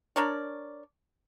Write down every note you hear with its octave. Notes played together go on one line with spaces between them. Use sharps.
D4 A#4 C#5 D5